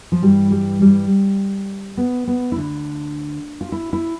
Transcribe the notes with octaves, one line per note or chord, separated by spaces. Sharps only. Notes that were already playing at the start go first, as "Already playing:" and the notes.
F3
G2 E3 G3
G3
G3
B3
B3
E4
D2 D3 D4
F4
E4
E4